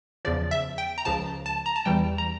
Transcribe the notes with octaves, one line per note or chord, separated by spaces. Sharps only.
E2 C#3 F3 D5
E5
G5
A#5
C#2 C#3 F3 A5
A5
A#5
A5
E2 E3 G3 G5
A#5